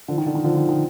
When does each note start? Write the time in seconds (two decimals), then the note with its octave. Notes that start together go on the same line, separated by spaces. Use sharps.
0.08 D3 F3
0.18 D#3
0.26 D3
0.35 D#3
0.44 D3 F3
0.57 D#3
0.69 D#3